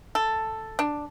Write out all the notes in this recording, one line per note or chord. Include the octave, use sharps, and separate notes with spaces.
A4
D4